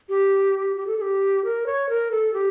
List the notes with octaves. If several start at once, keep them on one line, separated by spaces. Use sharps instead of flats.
G4
G4
A4
A4
G4
A#4
C#5
A#4
A4
G4